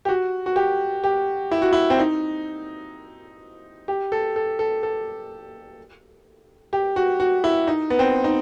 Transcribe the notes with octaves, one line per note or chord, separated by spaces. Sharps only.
G4
F#4
F#4
G4
G4
E4
F#4
E4
C4
D#4
G4
A4
A4
A4
A4
G4
F#4
F#4
E4
D#4
B3
C4
D#4